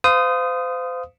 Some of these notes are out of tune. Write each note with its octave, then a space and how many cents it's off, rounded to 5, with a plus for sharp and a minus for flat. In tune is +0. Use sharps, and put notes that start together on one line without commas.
C5 -35 F5 +0 D#6 +0